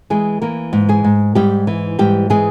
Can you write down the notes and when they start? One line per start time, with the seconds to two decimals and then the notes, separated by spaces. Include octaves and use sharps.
0.10 E3 G#3 G#4
0.41 E3 A#3 A#4
0.73 G#2
0.89 G#3 G#4
1.04 G#2
1.35 G#2 G3 G4
1.67 E3
1.99 G#2 G3 G4
2.30 E3 G#3 G#4